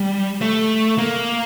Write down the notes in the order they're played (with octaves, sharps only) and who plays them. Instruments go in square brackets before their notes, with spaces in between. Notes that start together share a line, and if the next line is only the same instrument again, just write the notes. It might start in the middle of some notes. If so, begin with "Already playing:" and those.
Already playing: [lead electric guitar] G3
A3
A#3